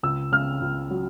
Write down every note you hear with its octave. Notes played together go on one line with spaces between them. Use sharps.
C#2 E6
C#3 F6
C#2
F#3